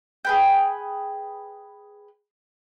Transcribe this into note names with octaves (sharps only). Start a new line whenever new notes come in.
G#4 B4 G5